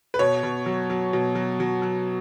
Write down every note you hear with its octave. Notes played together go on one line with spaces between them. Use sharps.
B4
B2 C#5
B2
F#3
F#3
B2
F#3
F#3
F#3